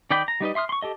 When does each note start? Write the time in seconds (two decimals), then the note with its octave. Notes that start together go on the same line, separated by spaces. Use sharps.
0.11 D#3 D5 D#5 G5 B5
0.28 A#5
0.41 G3 D#4 B4 D#5
0.55 E5 C6 D#6 F6
0.69 C6 C#6
0.82 G4 A4 D#5